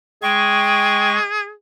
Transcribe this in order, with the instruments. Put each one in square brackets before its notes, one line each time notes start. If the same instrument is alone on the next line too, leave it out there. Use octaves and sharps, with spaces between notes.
[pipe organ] G#3 C#6 [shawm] G#4 [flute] G5